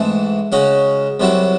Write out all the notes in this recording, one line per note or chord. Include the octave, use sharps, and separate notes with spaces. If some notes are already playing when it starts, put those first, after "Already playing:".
Already playing: G#2 E3 A3 C4
C#3 G#3 C#4 F#4
C2 C3 F#3 C4 E4